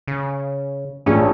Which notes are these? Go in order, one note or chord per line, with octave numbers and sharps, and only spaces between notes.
C#3
A1 A#2 C#4 D4 G#4